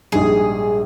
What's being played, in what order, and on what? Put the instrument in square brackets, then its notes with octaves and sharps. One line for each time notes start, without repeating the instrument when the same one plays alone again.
[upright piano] A#1 G#2 G3 [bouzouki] G#4